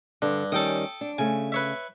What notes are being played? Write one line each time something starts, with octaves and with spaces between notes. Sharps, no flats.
G2 D3
D#3 G3 C#4 A4 G5 D#6
D4
C#3 A3 G#5
B4 C#5 E5